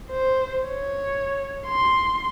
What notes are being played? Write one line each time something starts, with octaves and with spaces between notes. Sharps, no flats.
C5
C#5
C6